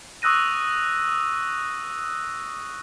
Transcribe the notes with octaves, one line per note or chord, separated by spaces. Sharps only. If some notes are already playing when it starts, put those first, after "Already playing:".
C#6 D#6 E6 F#6 A#6 D#7